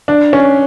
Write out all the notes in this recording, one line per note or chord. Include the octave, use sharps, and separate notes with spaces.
D4
C#4